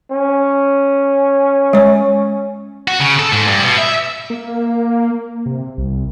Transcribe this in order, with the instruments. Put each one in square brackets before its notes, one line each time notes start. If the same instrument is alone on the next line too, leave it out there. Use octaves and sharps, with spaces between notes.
[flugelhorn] C#4
[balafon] G#3 C#5
[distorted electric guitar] F#4
C#3
A4
G#2
G2
B2
E5
[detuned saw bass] A#3
C3
C2